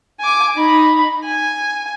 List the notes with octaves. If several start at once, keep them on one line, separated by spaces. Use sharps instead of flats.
G#5 D6
D#4 B5
G#5